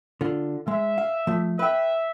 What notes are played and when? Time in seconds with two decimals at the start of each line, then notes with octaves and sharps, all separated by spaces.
0.21 D3 F4
0.68 G#3 E5
0.98 F5
1.27 F3 A3
1.59 B4 E5 G5